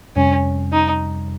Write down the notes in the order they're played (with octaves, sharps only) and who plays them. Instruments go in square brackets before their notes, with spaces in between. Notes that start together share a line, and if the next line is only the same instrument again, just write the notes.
[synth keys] F2 C3 G3 [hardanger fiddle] C#4
[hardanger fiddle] D#4